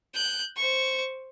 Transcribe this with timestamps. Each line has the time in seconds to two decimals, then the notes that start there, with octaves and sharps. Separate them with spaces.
0.14 F#6 G6
0.56 C5 C#6